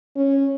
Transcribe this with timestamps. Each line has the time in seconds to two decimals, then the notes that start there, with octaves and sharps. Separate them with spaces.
0.16 C#4